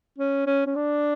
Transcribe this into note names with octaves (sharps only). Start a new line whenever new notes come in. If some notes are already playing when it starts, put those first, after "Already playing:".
C#4
C#4
C#4
D4